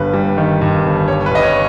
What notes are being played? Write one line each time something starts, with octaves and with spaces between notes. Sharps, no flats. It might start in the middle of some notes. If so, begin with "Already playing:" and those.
Already playing: G1 G2 B4
G3
D#3
G2
G1
G3 C#5
B4
G2 D#5
C#5